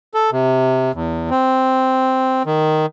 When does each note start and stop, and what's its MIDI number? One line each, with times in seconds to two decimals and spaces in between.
0.14 0.30 69
0.32 0.92 48
0.94 1.30 40
1.30 2.43 60
2.46 2.86 51